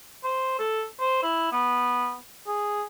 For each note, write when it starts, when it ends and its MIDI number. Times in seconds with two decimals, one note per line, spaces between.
0.24 0.58 72
0.59 0.83 69
1.00 1.22 72
1.23 1.49 64
1.52 2.15 59
2.47 2.83 68